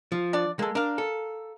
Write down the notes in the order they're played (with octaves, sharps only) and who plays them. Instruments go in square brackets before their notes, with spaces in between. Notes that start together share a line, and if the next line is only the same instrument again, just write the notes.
[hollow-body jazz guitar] F3
[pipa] D4 D5
[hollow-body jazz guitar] G#3 [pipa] A#3 A4
[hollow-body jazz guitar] D4 [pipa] A#4 F5
[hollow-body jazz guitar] A4